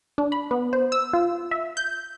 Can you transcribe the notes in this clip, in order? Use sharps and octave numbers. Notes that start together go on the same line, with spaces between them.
D4
B5
B3
C5
E6
F4
E5
G6